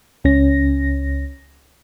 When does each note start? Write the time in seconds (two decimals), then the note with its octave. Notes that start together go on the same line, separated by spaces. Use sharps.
0.24 C#2 C#4 A#6